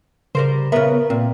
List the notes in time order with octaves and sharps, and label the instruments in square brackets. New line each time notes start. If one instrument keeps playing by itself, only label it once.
[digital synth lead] C#3 [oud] G3 A#4 C5
[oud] C#3 B3 [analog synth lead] A#4 [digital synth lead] E5
[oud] A#2 [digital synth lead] C4